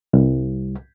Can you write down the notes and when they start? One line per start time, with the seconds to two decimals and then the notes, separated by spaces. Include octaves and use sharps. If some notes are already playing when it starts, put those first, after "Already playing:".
0.13 C2